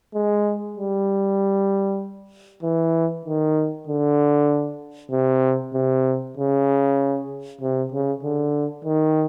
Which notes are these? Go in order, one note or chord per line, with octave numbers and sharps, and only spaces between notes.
G#3
G3
E3
D#3
D3
C3
C3
C#3
C3
C#3
D3
D#3